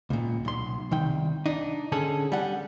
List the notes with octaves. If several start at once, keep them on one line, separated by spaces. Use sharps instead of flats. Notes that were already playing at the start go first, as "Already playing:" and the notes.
C#2 A#2
B1 C6
C2 D#3 G5
D4 D#4
D3 C#4 G#4 A4
G3 F#5